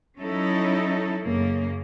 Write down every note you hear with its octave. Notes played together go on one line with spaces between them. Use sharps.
F#3 C#4 D#4 E4 A4
F#2 C#3 A#3